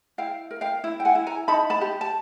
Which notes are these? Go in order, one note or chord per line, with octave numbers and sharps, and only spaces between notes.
E4 F5 G5
A#4
F5 G5
E4
G5
F#5 G#5
E4
G#5 A#5
D#4 A5 B5
A5 B5
G4
A5